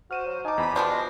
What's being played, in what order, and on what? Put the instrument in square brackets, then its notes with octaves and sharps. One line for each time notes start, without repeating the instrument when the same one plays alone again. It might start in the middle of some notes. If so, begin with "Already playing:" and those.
[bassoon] F#4 [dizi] C5 [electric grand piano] F6 D#7 E7
[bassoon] F#3
[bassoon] D#4 [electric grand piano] G#5 D6 [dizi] A5
[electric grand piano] E2 [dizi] B5
[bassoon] B2 [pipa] F3 G3 D4 [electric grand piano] G#5 C6 G6 [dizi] B5
[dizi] D#5